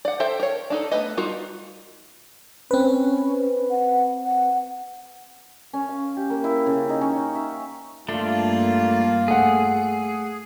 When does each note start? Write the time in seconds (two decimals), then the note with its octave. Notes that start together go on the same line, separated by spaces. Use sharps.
0.05 D5 F#5
0.20 A4 C5 E5 G5
0.40 A#4 C#5
0.70 D4 D#4 A4
0.91 A3 B3 B4 D#5
1.17 G3 D#4 F4 F#4 A#4
2.71 C4 C#4 B4
3.70 F#5
4.26 F#5
5.73 C#4
5.89 F5
6.17 G4
6.30 A#3
6.44 E4
6.66 C#3
6.89 D#4
7.01 C#4
7.16 D#4
7.35 E5
8.09 G2 A3 A#3 D4 F4
9.28 A3 G#4 F#5